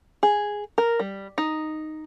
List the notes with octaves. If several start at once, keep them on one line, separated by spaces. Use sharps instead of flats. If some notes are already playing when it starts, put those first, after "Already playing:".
G#4
A#4
G3
D#4